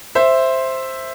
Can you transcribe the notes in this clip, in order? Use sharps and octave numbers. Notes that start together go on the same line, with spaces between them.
C5 E5